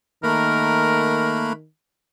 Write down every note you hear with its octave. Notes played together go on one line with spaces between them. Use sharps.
D#3 A3 A#3 A#4 B5 F#6